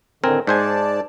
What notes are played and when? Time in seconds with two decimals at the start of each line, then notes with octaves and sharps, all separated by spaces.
0.24 A2 D3 D#3 C4 A#4 G#5
0.47 G#2 C5 D5 G#5 A5